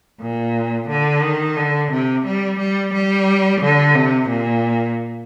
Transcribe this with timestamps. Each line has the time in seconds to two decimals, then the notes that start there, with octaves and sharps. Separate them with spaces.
0.21 A#2
0.88 D3
1.23 D#3
1.57 D3
1.91 C3
2.26 G3
2.58 G3
2.93 G3
3.61 D3
3.95 C3
4.29 A#2